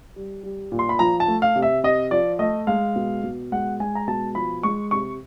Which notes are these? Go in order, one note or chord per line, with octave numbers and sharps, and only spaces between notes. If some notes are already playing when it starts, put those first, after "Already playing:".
G3
G3
A#2
C6
B5
F3 A#5
A5
A3
F5
C3
E5
C3 D#5
F3 D5
A3 D#5
G#3 F5
B2
B2
G#3 F#5
G#3 G#5
A#5
B2 A5
F3 B5
G#3 C#6
C3 C#6